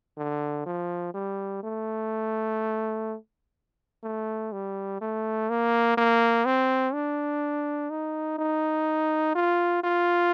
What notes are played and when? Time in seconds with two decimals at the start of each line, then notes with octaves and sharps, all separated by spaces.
0.18 D3
0.66 F3
1.14 G3
1.63 A3
4.04 A3
4.52 G3
5.01 A3
5.50 A#3
5.98 A#3
6.45 C4
6.94 D4
7.90 D#4
8.39 D#4
9.35 F4
9.83 F4